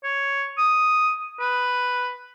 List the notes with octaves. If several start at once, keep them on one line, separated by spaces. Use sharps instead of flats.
C#5
D#6
B4